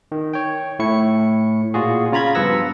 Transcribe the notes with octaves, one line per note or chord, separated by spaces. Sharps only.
D#3
C#5 G5
A2 E4 C#6 C#7
A#2 F4 F#4 G#4
C#3 F4 A#5 B5 G#6
G2 F3 B3 F#5 E6 A#6